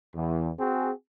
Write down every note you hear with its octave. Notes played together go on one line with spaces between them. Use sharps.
E2
C4 F#4 G#4